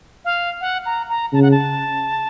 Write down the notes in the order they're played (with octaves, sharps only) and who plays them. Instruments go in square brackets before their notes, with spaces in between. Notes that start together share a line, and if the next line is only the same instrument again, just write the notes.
[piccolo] F5
F#5
A#5
A#5
[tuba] C#3 [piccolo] A5
[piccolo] F#5
A5